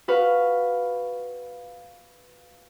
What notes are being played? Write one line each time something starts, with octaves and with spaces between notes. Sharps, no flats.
F#4 B4 F5